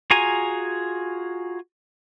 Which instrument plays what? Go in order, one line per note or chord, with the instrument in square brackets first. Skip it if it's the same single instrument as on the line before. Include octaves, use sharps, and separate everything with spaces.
[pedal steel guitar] F4 F#4 G#4 G#5 A#5